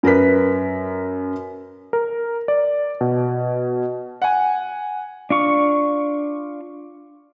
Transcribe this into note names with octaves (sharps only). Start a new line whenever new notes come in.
F#2 A#4 B4 B6
A#4
D5
B2
F#5 G#5
D4 F4 C#6